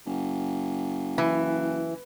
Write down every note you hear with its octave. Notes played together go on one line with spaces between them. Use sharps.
F#1
E3